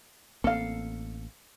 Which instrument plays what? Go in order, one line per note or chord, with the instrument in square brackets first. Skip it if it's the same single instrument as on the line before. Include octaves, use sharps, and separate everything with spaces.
[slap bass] A1 A#3 C4 [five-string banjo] A4 F5